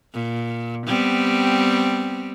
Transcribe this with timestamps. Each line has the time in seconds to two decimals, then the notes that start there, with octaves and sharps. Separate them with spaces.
0.14 A#2
0.86 G3 B3 C4